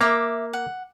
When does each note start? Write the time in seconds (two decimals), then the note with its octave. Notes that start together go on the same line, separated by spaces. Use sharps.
0.01 A#3 E5 A#5 D6
0.53 F#5